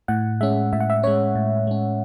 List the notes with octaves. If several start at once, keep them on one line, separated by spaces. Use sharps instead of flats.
A2 F#5
G#3 C#4 E5
A2 E5
F#5
E5
G#3 C#4 C#5
A2
G#3 C#4